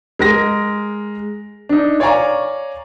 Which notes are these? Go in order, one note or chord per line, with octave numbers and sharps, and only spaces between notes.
G#3 A#4 A#6
D4 D#4
C#5 D5 F5 G#5 A#5 C#6